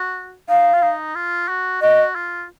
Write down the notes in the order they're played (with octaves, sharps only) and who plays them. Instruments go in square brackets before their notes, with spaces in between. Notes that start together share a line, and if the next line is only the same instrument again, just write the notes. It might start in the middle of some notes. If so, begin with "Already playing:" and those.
Already playing: [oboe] F#4
[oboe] D#4 [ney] F5
[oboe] F4
D#4
F4
F#4
[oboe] F#4 [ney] D#5
[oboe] F4